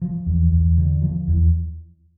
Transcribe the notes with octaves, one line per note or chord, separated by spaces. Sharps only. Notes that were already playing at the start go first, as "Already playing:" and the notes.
F3
E2
E2
D3
F3
E2